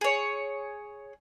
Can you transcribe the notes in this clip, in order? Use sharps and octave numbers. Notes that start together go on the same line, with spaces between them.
G#4 C#5